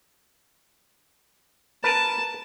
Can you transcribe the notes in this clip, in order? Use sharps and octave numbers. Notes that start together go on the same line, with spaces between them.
A#4 B4 A5